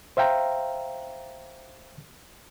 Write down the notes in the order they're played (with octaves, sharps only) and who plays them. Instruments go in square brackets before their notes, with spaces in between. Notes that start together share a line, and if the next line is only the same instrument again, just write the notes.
[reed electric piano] C5 E5 F5 G5 A#5